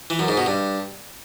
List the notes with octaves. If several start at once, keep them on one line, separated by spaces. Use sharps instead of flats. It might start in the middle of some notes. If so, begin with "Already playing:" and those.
E3
F#2
G#2
B2
G2